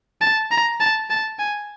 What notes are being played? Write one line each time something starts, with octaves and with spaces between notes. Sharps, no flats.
A5
A#5
A5
A5
G#5